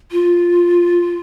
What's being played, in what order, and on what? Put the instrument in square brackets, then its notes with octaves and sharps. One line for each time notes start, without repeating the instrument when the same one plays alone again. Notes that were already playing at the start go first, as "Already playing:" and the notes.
[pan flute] F4